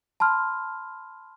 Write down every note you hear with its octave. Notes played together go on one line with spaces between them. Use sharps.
A5 B5 C6 F6